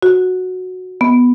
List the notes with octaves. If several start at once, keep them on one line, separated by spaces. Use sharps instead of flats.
F#4
B3